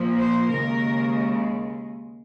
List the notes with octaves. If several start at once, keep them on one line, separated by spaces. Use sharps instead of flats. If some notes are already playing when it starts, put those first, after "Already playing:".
Already playing: A#2 F3 A#3
C5
D#2 C#3 G#3 A#4